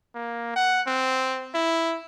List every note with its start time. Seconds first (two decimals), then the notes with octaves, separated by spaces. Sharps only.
0.15 A#3
0.56 F#5
0.87 C4
1.54 E4